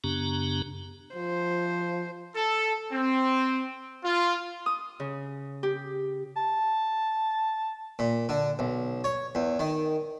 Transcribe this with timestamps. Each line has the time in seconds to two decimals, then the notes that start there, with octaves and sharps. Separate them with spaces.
0.04 F#2 C#3 B3 D4 G4 A#5
1.15 F3 C5
2.35 A4
2.92 C4
4.04 F4
4.66 D#6
5.00 C#3
5.63 G4
6.36 A5
7.99 A#2
8.29 D3
8.59 B1
9.04 C#5
9.35 E2
9.59 D#3